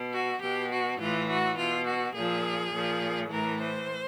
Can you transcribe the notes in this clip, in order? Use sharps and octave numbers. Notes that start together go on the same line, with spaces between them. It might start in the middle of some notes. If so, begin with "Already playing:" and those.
Already playing: B2
F#4
B2 G4
F#4
A2 E3 F4
F#4
B2 F4
F#4
A#2 F3 G#4
A#2 F3
A2 E3 A#4
C5